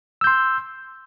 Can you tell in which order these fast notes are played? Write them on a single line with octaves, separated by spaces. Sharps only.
E6 G6 C6